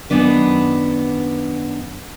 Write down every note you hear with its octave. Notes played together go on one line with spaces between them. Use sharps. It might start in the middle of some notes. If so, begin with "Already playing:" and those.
F#2 D#3 B3 D4 B4